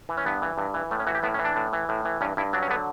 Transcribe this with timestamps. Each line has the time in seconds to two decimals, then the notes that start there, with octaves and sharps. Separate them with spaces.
0.09 E3
0.17 C#4
0.26 G2 B3
0.42 E3
0.58 G2
0.74 E3
0.91 A2 A3
1.00 C#4
1.06 E3 F#4
1.15 G4
1.23 A2 B3
1.34 C#4
1.39 E3
1.45 D4
1.56 A2
1.73 E3
1.89 A2
2.05 E3
2.21 G2 C#4
2.37 G2 E4
2.53 F#3 D4
2.62 C#4
2.70 D3 B3